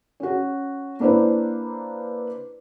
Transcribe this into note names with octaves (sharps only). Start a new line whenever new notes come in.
C#4 F#4
A#3 D4 E4 B4 C5